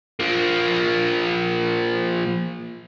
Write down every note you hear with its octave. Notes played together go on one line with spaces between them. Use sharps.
F3 A#3